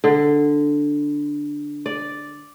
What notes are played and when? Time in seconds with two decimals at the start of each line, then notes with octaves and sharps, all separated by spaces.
0.04 D3
1.86 D5